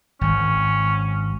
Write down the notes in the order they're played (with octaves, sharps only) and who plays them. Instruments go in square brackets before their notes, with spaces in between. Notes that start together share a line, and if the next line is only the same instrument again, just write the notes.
[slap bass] G#1 [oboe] C#4